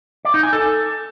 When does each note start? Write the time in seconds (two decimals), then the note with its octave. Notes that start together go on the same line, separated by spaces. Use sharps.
0.25 D5
0.34 D#4
0.43 G#5
0.53 A4